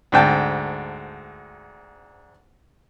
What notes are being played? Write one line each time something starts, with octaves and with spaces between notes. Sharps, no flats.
D2 G#2 G5 A5